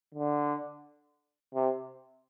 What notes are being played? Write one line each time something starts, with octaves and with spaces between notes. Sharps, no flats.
D3
C3